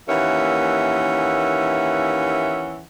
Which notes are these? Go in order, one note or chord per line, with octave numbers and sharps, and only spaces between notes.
D#2 E3 A#3 C#4 E5 F#5